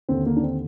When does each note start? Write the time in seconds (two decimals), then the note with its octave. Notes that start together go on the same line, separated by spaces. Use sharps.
0.09 D#2 D3 C4
0.26 A#3
0.36 D4
0.43 C4